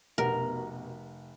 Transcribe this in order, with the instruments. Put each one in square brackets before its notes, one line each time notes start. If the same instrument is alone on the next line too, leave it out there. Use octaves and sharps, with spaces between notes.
[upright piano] F1 G4 F#5 [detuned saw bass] B2 [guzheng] A#4